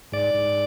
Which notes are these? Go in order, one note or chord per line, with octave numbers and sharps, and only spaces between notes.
G#2 D5
G#2